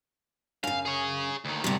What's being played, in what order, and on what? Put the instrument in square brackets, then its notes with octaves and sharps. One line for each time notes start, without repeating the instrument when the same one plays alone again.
[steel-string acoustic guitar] F#2 C#3 [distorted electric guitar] F5
[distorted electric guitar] G#4 C#5
D2 D#3
[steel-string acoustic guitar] C3 G3